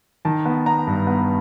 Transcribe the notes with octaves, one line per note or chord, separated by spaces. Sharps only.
D#3 A5
B3
B3 A#5
G2
B3